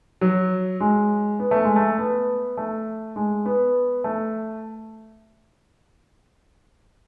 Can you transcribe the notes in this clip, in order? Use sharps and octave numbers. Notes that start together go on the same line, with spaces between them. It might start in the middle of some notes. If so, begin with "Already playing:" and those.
F#3
G#3
B3
A3
G#3
A3
B3
A3
G#3
B3
A3